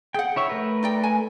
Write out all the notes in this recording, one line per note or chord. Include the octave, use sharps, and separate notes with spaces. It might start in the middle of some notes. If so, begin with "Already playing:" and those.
G#4 F#5 G5
E4 C#5 E5
A3 A#4 B4
D#4 D5 G5
G#5